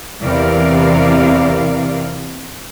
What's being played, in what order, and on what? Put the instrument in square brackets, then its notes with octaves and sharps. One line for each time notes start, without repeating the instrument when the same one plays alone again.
[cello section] E2 C3 E3 A#4 D5 F5